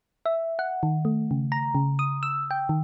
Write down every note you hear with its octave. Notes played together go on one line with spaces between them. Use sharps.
E5
F#5
D#3
A3
C#3
A#5
C#3
D#6
E6
G5
D#3